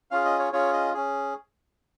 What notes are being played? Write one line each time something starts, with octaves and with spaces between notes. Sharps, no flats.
C#4 F4 G#4 F5
D#5
C#5
C#4 F4 G#4 C#5
D#5
C#4 G#4